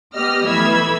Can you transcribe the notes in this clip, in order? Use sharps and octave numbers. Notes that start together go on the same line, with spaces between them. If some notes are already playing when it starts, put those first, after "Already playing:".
B3 G4 D#5 F6
E3 A3 B5 E6 G#6